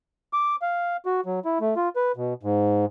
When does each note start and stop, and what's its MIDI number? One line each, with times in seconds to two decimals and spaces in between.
0.33 0.56 86
0.62 0.97 77
1.06 1.21 66
1.26 1.40 54
1.45 1.58 64
1.61 1.74 57
1.76 1.89 65
1.96 2.12 71
2.16 2.34 47
2.43 2.85 44